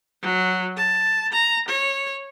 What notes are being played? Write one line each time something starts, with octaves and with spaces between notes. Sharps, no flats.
F#3
A5
A#5
C#5